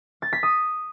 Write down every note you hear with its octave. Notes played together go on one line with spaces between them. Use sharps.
A6
B6
D#6